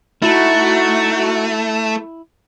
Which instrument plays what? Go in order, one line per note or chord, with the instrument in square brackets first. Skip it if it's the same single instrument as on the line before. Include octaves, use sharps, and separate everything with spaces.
[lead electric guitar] A3 [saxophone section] D#4 F#4 [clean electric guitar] E4